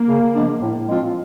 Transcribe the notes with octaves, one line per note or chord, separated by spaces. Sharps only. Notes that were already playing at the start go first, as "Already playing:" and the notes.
Already playing: A#3
C#3
F3 G#3 B3 D4
A2
F3 G#3 C4 F4